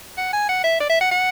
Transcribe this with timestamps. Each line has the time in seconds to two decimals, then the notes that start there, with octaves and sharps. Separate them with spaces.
0.18 F#5
0.33 G#5
0.49 F#5
0.64 E5
0.80 D5
0.90 E5
1.01 F#5
1.11 F#5